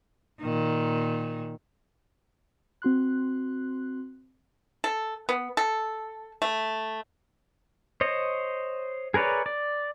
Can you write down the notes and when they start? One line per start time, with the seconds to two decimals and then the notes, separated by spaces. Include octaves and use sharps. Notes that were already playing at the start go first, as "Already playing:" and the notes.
0.41 A#2 D#3
2.82 C4 F#4 C6 F#6
4.84 A4
5.29 B3
5.57 A4
6.42 A3
8.01 C5 C#5 D#5
9.14 G#4 A#4 B4 C#5 D5
9.46 D5